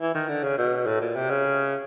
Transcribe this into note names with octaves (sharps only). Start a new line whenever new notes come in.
E3
D#3
D3
C#3
B2
A2
A#2
C3
C#3